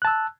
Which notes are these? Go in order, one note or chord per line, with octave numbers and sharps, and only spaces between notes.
A5 E6 F#6